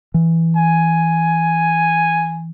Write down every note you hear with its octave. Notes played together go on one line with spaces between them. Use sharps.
E3
G#5